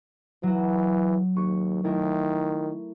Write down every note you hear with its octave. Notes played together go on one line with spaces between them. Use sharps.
E3 F#3 F#4
D#2 C#6
D#3 A3 E4 A#4